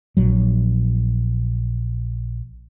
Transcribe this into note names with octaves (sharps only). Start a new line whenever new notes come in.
A#1 F#3